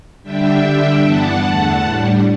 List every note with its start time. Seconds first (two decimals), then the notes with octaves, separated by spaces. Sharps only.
0.23 D3 G3 D4 E5 G5
0.63 D3 G3 D4
1.03 G2 E3 B3 D4 F#5 A5
1.42 E2 D3 A3
1.82 A2 G3 D4